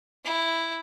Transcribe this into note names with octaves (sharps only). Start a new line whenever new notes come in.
E4